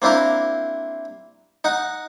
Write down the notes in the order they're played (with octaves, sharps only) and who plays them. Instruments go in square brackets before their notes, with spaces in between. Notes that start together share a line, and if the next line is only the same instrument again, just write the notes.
[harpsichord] A#3 C4 D4 E4 A#4
D#4 F#5